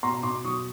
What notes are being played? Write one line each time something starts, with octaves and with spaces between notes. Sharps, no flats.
B2 A#5 C6
B2 C6 D6
F#3 C#6 D#6